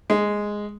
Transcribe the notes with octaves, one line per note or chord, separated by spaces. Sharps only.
G#3